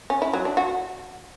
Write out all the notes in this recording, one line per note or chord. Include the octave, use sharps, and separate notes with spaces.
C#4
E4
F#3
D4
F#4